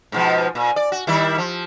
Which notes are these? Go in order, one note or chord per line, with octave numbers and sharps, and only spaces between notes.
G#2 B2 F3
A#2
D5
F#4
D#3 G3 E4
F3